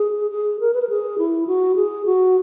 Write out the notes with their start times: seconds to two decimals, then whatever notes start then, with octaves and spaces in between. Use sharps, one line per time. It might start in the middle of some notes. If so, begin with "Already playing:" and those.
Already playing: G#4
0.31 G#4
0.60 A#4
0.74 B4
0.82 A#4
0.89 G#4
1.18 E4
1.47 F#4
1.76 G#4
2.06 F#4